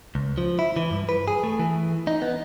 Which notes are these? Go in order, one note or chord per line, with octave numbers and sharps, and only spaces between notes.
C#2
F3
E4
E3
G2
B4
G#4
A3
E3
D#4
B3